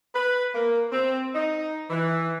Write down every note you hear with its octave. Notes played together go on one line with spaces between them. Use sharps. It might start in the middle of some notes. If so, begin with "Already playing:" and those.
B4
A#3
C4
D#4
E3